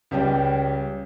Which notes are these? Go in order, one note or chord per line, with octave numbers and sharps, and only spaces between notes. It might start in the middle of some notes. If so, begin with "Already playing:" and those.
C#2 G3 C#4 G5